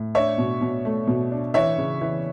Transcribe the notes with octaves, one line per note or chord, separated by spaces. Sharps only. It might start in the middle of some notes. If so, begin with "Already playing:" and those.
Already playing: A2
D4 C#5 E5
B2
B2
A3
B2
D4
E3 C#5 E5
C#3
E3